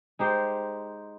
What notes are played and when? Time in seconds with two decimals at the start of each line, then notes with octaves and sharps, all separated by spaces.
0.19 G#3 D#4 G4 C5